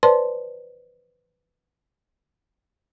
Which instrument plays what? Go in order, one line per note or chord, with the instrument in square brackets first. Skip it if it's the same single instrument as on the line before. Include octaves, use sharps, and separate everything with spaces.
[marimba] B4 C5 D5 A5 C6